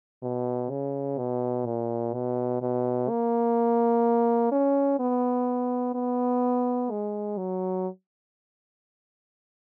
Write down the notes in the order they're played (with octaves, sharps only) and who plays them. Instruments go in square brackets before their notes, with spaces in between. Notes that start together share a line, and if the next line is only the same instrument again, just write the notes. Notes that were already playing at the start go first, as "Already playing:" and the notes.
[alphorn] B2
C#3
B2
A#2
B2
B2
A#3
C#4
B3
B3
G#3
F#3